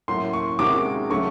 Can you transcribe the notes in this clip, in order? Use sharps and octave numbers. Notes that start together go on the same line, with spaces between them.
A2 F#3 A#3 C#4 E4 C6
C#6
C3 D#3 G#3 C#4 F#4 D6
C#3 F#3 A3 C#6